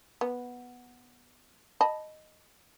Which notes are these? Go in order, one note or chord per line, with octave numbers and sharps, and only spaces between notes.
B3
D#5 A5 B5